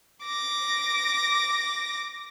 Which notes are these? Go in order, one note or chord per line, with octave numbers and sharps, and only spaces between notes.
D6 A#6